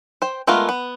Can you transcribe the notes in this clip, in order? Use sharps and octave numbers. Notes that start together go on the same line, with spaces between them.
C5 G5
G#3 A3 B3 F4 A#4
B3